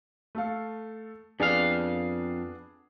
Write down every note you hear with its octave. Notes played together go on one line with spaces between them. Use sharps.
A3 A4 F5
F2 B3 D4 G#4 F5